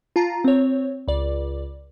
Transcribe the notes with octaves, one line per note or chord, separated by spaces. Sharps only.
F4 A5 A#5
C4 C#5
C#2 D5